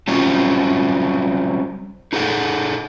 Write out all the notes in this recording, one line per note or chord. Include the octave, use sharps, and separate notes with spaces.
F#3 G3 C4 C#4 F4
D#4 G#4 A4 F#5